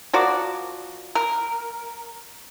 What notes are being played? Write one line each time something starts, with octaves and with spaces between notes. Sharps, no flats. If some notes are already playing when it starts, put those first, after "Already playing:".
F3 F#4 A#4 D5
A#4